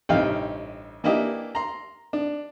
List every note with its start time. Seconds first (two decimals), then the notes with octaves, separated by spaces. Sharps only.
0.09 A1 G2 C3 D#4 F5 G5
1.04 E3 A#3 D4 E4 G4 D#5
1.55 A#5 C6
2.13 D4